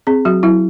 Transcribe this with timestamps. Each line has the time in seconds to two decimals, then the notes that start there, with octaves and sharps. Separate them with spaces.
0.07 C4 G#4
0.25 F#3 F#4
0.43 F#3 E4